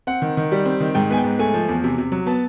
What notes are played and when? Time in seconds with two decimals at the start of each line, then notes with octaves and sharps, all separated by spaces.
0.07 C4 F#5
0.22 D#3
0.37 D#3
0.52 G3
0.66 C4
0.80 D#3
0.95 G#2 G5
1.10 B3 G#5
1.18 G5
1.24 G#2
1.39 A3 G#5
1.54 F3
1.69 E2
1.84 C3
1.98 C3
2.12 F#3
2.26 B3 A5